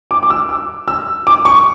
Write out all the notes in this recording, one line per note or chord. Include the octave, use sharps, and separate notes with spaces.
D6
D6
E6
D6
E6
D6
C#6